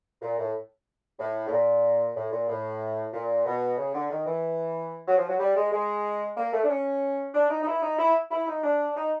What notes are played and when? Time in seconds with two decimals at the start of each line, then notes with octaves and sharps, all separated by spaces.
0.22 A#2
0.39 A2
1.19 A2
1.47 A2
1.52 A#2
2.16 A2
2.32 A#2
2.49 A2
3.13 A#2
3.46 B2
3.78 C#3
3.95 D3
4.10 D#3
4.27 E3
5.08 F#3
5.18 F3
5.29 F#3
5.40 G3
5.56 G#3
5.72 G#3
6.37 A#3
6.53 A3
6.64 D4
6.70 C#4
7.34 D4
7.50 D#4
7.62 D#4
7.67 E4
7.82 D#4
7.99 E4
8.31 E4
8.48 D#4
8.64 D4
8.97 D#4